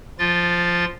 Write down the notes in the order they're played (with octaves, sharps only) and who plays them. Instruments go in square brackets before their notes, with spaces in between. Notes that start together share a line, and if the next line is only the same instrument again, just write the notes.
[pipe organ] F3 F4 A6